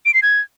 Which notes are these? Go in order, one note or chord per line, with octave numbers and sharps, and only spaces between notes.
D7
C7
G#6